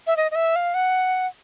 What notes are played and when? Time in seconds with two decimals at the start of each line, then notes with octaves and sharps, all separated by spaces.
0.07 E5
0.17 D#5
0.31 D#5
0.35 E5
0.56 F5
0.74 F#5